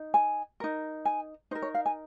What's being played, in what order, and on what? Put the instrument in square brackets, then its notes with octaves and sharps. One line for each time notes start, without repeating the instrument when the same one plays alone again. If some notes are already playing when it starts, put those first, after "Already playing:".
Already playing: [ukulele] D#4
G#5
D#4 A#4
G#5
D#4 C5
A#4
C#5
F5
G#5